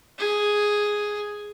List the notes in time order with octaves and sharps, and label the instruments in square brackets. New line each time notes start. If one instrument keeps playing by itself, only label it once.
[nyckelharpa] G#4